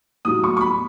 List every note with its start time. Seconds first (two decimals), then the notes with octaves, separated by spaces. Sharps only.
0.25 A2 F#3 D#6
0.44 C#6
0.57 C#6
0.61 B5